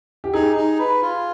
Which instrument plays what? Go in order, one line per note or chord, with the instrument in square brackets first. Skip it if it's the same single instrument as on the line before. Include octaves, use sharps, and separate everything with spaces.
[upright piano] G4
[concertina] D#4 [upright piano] G#4
[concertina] D#4
B4
F4